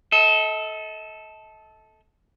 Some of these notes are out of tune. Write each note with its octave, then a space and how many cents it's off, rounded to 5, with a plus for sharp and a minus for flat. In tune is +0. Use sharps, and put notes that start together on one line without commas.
A4 -10 D#5 +40